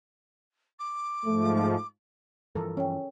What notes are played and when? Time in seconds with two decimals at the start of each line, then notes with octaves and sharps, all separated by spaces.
0.79 D6
1.25 G#2 F3 A3
2.55 G2 E3 F3 A4 A#4
2.77 C#4 C#5 G5